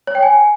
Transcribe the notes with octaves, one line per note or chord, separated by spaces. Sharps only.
C#5
G5
G#5